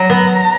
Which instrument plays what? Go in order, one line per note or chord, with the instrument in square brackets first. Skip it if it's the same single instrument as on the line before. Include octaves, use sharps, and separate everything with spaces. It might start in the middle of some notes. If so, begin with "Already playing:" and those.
Already playing: [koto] F#3 [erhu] A#5
[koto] B3